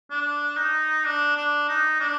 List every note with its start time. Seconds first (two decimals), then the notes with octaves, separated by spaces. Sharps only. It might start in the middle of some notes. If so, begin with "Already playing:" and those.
0.11 D4
0.57 D#4
1.06 D4
1.37 D4
1.69 D#4
2.00 D4